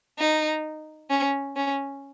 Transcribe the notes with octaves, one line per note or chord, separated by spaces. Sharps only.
D#4
C#4
C#4